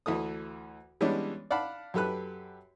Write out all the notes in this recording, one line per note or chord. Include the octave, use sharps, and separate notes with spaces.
D2 E3 A4 D#6
E3 G3 G#3 B3 C#4 D4
D5 F5 F#5 A5 B5
F#2 G4 A4 B4 F#6